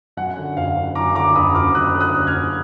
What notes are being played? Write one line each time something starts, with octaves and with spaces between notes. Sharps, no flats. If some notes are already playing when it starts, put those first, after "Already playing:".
F#2 F#5
D3
F#1 F5
F#1
F#2 A#5 D6
D3 A#5 D6
F#1 B5 D#6
F#1 D6 F6
F#2 D#6 F#6
D3
D#6 F#6
F#1
F6 G#6
F#1